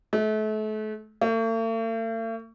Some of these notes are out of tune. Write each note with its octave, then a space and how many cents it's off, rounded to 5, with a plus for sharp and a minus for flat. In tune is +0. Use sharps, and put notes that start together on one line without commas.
A3 -35
A3 +45